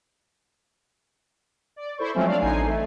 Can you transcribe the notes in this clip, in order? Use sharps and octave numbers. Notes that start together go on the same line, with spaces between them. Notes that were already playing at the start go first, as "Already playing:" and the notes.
D5
E4 A4 C5 C#6
F3 F#3 G#3 A3 C4 C#4
D4 D5 F5
A1 D3 D#4 G#5 C7
A3